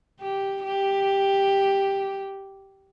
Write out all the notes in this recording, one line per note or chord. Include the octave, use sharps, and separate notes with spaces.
G4
G4